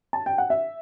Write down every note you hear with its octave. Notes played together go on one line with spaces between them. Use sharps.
A5
G5
F#5
E5